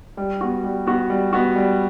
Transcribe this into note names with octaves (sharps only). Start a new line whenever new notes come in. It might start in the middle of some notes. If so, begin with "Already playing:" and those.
G3
B3 F#4
G3
B3 F#4
G3
B3 F#4
G3